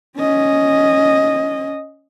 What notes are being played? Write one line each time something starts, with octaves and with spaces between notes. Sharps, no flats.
C#4 D#5